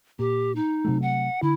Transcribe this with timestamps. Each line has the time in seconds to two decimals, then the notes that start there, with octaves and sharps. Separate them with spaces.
0.19 A#2 G4
0.55 D#4
0.85 C3 F#3 A3
1.02 F#5
1.42 D3 E4